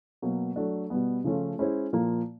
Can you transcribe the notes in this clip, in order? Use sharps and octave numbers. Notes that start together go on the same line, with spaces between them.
B2 F#3 A#3
F#3 A3 D4
B2 G3 B3
C#3 F3 A3 C#4 F4
G#3 C#4 E4 G#4 C5
A#2 F3 A#3